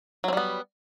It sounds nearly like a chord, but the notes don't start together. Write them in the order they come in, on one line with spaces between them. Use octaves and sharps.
F#3 C4 G3 B3